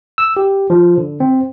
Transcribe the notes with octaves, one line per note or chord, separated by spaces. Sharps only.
E6
G4
F3
D3
C4